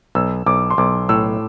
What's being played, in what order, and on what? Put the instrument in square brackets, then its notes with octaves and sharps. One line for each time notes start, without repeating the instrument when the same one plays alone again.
[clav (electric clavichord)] B1 [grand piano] E6
[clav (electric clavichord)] B1 [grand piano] D6
[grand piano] C6
[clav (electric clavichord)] B1 [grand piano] D6
[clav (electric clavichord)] A2 [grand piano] E6